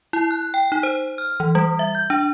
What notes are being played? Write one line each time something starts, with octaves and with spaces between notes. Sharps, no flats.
E4
F#6
G5
D#4
C5
F6
E3
G3
E5
G6
D4